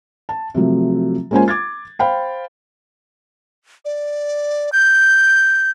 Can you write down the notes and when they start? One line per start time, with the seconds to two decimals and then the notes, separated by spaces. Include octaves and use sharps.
0.29 A5
0.54 C3 F3 F#3 A3
1.31 G#3 A#3 C#4 F4 C5 G#5
1.48 D6 G#6 A6
1.99 C5 F5 G5 B5
3.85 D5
4.73 G6